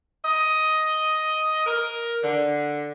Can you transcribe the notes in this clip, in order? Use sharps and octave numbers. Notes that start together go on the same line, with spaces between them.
D#5
A#4
D3